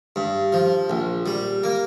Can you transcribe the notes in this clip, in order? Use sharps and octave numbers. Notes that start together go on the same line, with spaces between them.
G2
F3
A#1
G3
A#3